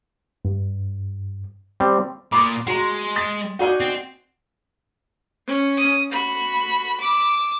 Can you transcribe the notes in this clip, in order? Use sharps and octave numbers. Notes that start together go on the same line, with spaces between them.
G2
G3 C4
A#2 B5 C6 D6 D#6
G#3 F#4 A#5 C6
D#6 A6 B6
D#4 F#4 G#4 D5 D#5 F#5
C4
C#4
D#6
F#4 B5
D6 E6